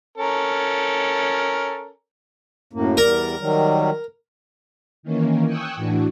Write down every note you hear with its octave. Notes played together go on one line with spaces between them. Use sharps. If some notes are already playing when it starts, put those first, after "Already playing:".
C#4 A4 A#4
F#2 A2 A#3
E2 G3 A#4 D5
D#3 F#3 G3
D#3 E3 A#3 C#4
G5 G#5 C#6 D#6 E6 F#6
A2 E3 D4 F#4